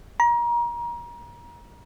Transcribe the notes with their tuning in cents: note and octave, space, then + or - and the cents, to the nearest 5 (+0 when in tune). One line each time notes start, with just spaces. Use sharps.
A#5 +30